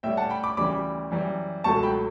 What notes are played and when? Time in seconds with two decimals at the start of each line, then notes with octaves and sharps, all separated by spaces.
0.03 A2 G3 E5 G5
0.17 F#5 A5
0.30 G5 B5
0.43 B5 D6
0.57 D2 C#3 E3 G3 B5 D6
1.11 F#2 E3 G3
1.64 C#2 B2 F#3 A3 A5 C#6
1.83 G5 B5